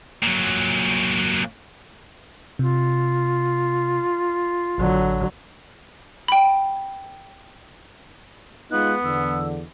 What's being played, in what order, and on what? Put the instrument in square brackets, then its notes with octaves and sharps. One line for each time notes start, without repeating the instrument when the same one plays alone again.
[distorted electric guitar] A#2 F#3
[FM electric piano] C3 [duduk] F4
[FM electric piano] A1 [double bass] D3 F#3
[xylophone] G5 B5
[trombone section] G#3 D#4 F4 [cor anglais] B3 [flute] F#6
[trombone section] E2 D3 [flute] E6